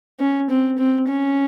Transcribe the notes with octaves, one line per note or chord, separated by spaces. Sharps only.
C#4
C4
C4
C#4